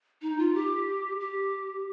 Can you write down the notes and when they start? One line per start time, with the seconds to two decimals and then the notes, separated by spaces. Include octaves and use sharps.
0.22 D#4
0.39 F4
0.54 G4
1.20 G4